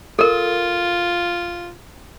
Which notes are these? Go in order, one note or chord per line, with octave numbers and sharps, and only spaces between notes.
F4 A4 A#4